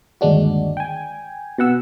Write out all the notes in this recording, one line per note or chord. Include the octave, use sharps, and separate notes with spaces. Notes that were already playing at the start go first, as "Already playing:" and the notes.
G1 D#2 G#3 D4 F#4
G5 G#5
B2 B3 F#5 E6